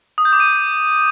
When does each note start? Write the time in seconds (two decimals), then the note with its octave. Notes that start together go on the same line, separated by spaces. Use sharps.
0.18 D#6
0.25 G6
0.33 D6
0.40 D#7